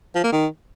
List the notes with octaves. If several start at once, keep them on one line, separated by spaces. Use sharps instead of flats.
F3
A#3
D#3